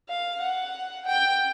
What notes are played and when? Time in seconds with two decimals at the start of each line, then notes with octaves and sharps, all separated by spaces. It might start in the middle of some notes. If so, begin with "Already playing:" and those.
0.09 F5
0.41 F#5
1.06 G5